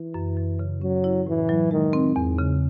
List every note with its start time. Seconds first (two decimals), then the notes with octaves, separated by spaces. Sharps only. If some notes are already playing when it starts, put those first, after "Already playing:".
Already playing: E3
0.14 F#2
0.37 F#2
0.59 C#3
0.81 F#3 C#4
1.04 E4
1.26 A2 E3
1.49 F#3
1.71 D#3 G#3
1.93 C4
2.16 E2 G#2
2.39 C#3